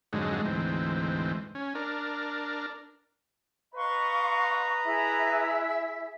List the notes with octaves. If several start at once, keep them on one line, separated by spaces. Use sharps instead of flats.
F2 G#2 D3 F#3 G#3
D2 G#2 E3 C4
C#4
D4 A#4
B4 D#5 F5 A#5 C6 C#6
E4 G#4 E5